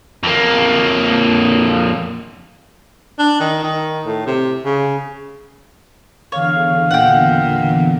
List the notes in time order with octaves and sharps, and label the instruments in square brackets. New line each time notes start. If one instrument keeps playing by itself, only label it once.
[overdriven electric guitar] F2 A#3
[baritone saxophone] D4
D#3
D#3
A2
C3
C#3
[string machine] E2 D3 [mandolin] C#5 [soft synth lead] F5
[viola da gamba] A#2 [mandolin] F#5 G5